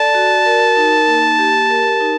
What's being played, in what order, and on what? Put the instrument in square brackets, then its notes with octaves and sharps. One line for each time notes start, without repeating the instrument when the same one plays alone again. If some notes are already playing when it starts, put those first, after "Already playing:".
Already playing: [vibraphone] A4 D5 [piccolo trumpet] A5
[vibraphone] F#4
A#4
D#4
A#3
G4
A#4
D#4